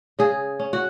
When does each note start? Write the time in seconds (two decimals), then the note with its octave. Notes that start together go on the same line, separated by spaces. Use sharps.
0.19 C#3 G#4
0.60 C#4
0.73 F#4